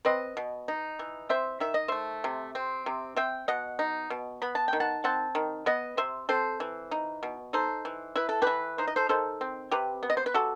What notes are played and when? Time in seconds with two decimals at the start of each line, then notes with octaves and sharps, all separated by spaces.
0.05 C4 B4 D#5
0.37 B2
0.68 D#4
0.99 E3
1.29 C4 C5 E5
1.60 D#3 E5
1.74 D#5
1.88 A3 C5 E5
2.24 C3
2.55 C4
2.86 C3
3.16 C4 E5 G5
3.48 B2 D#5 F#5
3.79 D#4
4.10 B2
4.42 B3 B5
4.55 A5
4.68 D#3 G5
4.80 F#5 A5
5.04 C4 F#5 A5
5.35 D#3
5.66 B3 B4 D#5
5.97 C3 C5 E5
6.29 C4 A4 C5
6.60 E3
6.91 D#4
7.23 B2
7.53 D#4 A4 C5
7.85 E3
8.16 E4 B4
8.29 A4
8.42 E3 G4 B4
8.78 D#4 C5
8.87 D#5
8.96 A4 C5
9.09 D#3 A4 C5
9.41 C4
9.71 C3 G4 B4
10.03 B3
10.10 D#5
10.17 C5
10.26 B4
10.34 C3 F#4 A4